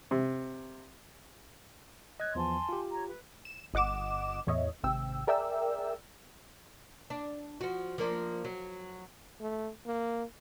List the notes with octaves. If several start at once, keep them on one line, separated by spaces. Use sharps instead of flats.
C3
C#5 D#5 E6 F#6 G#6
E2 F3 B3 G#5 A5 C6
F4 G4
C#5 A#5
B4
E7
G1 D#5 F#5 D6 E7
E2 A2 C#5 D#5 E5
G#1 C3 G5 E6
G#4 A#4 D5 E5 G5 E6
D4
F3 F#4
F3 A#3 D4
F#3
A3
A#3